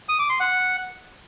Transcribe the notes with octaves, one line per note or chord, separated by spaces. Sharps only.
D#6
D6
C6
F#5